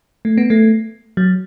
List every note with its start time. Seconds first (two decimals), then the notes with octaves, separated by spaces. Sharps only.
0.25 A3
0.38 B3
0.50 A3
1.17 F#3